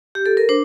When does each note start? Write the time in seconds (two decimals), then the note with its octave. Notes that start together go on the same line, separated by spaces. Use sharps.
0.15 G4
0.26 A4
0.37 A#4
0.49 D4 C5